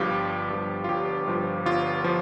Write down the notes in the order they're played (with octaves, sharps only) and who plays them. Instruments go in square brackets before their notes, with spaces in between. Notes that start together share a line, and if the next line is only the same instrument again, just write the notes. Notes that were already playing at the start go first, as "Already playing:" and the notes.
Already playing: [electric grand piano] G1 G2 F3 F4 G4
G1
G2 F3
F4
G1 G4
G2 F3
G1 F4
F3